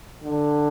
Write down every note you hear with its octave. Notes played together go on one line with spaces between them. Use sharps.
D3